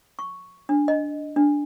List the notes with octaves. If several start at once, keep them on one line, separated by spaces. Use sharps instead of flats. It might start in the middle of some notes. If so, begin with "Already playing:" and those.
C#6
D4
D#5
D4